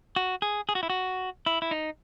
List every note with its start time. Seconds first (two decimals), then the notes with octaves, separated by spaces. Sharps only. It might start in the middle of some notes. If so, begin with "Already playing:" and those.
0.16 F#4
0.42 G#4
0.69 G#4
0.75 F#4
0.83 E4
0.90 F#4
1.46 E4
1.62 E4
1.71 D#4